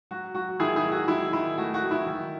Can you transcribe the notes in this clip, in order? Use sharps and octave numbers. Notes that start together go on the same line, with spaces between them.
F#3 F#4
F#3 F#4
D#3 E4 G#4
E4 G#4
F#3
F#4
D#3 E4
D#3 E4
A3 F#4
F#4
F#3
E4
D#3